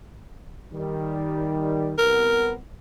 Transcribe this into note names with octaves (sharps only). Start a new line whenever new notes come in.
D#3 G3
C2 B3 A#4